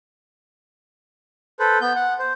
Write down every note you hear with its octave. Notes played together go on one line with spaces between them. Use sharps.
A4 B4 C5
B3 G6
F#5
C5